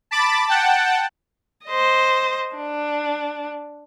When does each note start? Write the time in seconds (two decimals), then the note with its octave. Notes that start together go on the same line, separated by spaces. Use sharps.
0.11 A5 B5 D6 A6
0.48 F#5 G5 A5
1.66 C5 D#5
2.56 D4